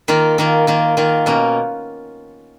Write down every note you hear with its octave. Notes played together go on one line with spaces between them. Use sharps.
D#3 A#3 F4
D#3 A#3 F4
D#3 A#3 F4
D#3 A#3 F4
B2 A#3 C#4